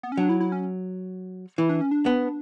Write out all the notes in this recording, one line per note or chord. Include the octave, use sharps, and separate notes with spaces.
B3
C#4
F#3 D4
E4
E4
C#4
E3 E4
D4
C#4
D4
B3